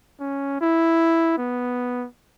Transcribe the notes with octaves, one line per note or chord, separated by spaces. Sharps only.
C#4
E4
B3